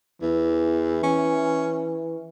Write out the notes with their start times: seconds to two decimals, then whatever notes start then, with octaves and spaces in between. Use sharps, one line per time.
0.22 E2 E3
1.03 C#4